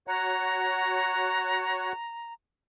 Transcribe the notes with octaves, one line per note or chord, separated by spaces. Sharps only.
F#4 C#5 F#5 A#5